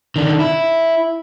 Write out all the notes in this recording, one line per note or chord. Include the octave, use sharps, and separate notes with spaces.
D#3 D4
E4